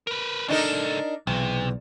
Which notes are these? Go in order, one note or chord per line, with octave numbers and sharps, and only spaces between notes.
A#4 B4
C#2 D4 D#4 A4 A#4
B1 E2 C3